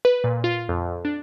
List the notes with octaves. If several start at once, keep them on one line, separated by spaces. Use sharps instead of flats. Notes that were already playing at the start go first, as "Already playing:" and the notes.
B4
A#2
F4
F2
D4